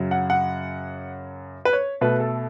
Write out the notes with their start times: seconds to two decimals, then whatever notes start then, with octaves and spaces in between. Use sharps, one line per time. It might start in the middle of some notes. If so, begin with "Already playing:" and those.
Already playing: F#2 C#3 F#3
0.11 F#5
0.30 F#5
1.65 B4
1.73 C#5
2.01 B2 A3 B4
2.20 A4